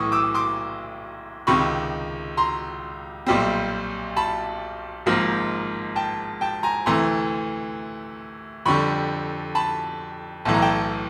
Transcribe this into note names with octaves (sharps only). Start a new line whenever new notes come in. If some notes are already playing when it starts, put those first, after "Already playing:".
Already playing: B1 A2 E3 C#6 D#6
D6 E6
C6 D6
C#2 C3 D#3 B5 C#6
A#5 C6
B1 A#2 G3 C4
A5 B5
G#1 G#2 F3 A#3
G5 A5
G5 A5
G#5 A#5
D2 C3 E3 A3 A#5 C6
F2 D3 G3 B5 C#6
A5 B5
B1 A2 E3 A5
A#5
G5 A5